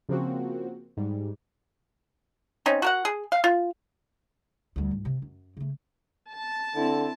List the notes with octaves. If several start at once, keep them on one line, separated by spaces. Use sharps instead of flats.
C#3 F3 A#3 C4 F#4
G#2 G3
C4 C#4 D#4
F#4 A#4 F#5
G#4
F5
F4
D2 G3
C#2 G#2
C3
F#2
C#3 A3
A5
D3 C4 E4